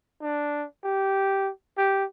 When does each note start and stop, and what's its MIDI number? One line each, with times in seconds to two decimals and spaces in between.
0.22 0.66 62
0.84 1.50 67
1.78 2.04 67